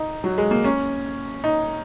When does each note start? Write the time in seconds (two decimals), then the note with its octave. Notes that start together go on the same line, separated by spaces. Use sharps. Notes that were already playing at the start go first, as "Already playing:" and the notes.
Already playing: D#4
0.24 F#3
0.38 G#3
0.51 A#3
0.64 C#4
1.44 D#4